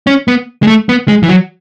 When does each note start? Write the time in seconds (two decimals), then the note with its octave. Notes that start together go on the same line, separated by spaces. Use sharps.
0.07 C#4
0.28 B3
0.63 G#3
0.67 A3
0.89 B3
1.08 G#3
1.23 E3
1.29 F#3